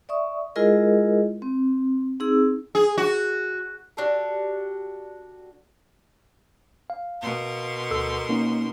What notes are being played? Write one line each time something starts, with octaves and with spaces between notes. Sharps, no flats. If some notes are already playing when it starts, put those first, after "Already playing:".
D5 E5 C#6 D#6
G#3 E4 F4 G#4 A#4 D#5
C4
C4 D#4 G#4 E6
G#4
F#4
D4 F#4 G4 A4
F5
B2 A#4 C6
D2 A4 E6
A#3 C#4 D#4